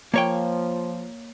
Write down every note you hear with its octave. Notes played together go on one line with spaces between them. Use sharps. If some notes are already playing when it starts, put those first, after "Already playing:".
F3 A#3 C#5 G5